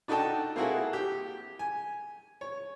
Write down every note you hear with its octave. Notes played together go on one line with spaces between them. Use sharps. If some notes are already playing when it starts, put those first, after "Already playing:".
D4 D#4 F#4 A4 G5 A5
A#3 C4 E4 F#4 G#4 A4
G4
G#5
C#5